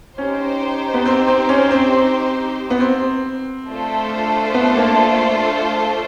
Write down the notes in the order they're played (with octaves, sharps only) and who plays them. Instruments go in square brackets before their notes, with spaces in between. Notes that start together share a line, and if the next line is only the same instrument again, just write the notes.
[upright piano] C#4 [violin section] D#4 G4 C5
[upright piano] B3
C4
C4
C#4
C4
C4
B3
C4
[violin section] A3 D4 F4 A4 C5
[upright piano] B3
A#3